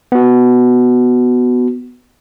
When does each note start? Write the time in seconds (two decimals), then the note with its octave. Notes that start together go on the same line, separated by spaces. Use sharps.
0.12 B3 F#4